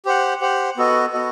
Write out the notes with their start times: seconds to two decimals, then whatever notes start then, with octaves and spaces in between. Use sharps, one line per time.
0.06 G4 C5 F#5
0.41 G4 C5 F#5
0.77 B3 F#4 A4 D#5
1.13 B3 F#4 A4 D#5